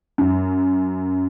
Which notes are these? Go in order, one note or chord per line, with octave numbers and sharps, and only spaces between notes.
F#2